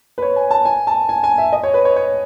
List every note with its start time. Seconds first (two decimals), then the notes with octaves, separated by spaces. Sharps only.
0.18 B4
0.22 C#5
0.36 G#5
0.51 A5
0.65 G#5
0.87 A5
1.09 G#5
1.24 G#5
1.38 E5
1.53 D#5
1.63 C#5
1.74 B4
1.85 C#5
1.96 C#5